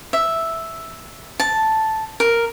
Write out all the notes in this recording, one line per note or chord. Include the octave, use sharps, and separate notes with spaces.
E5
A5
A#4